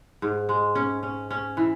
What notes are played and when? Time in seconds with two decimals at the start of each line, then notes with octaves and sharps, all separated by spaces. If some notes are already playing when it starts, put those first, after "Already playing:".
0.22 G#2
0.49 G#3
0.75 C#4
1.03 C#4
1.31 C#4
1.57 E3